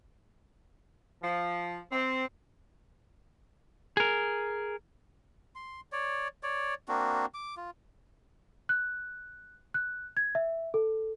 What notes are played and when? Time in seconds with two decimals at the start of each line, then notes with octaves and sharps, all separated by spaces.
1.23 F3
1.92 C4
3.97 G#4 A#4
5.55 C6
5.92 C#5 D5
6.43 C#5 D5
6.88 A#3 C4 D4 F#4
7.34 D6
7.57 F4
8.69 F#6
9.74 F#6
10.17 G#6
10.35 E5
10.74 A4